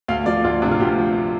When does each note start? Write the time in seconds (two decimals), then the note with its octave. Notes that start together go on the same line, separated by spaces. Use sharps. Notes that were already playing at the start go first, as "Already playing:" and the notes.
0.08 D2 F5
0.26 F3 D5
0.44 D2 F4
0.62 C3 D4
0.71 F4
0.80 D2 G4
0.98 F3